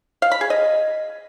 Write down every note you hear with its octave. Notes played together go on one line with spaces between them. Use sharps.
F5
B5
G#4
D#5